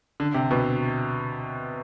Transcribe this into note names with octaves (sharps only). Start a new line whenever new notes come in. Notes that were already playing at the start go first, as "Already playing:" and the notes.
D3
C3
B2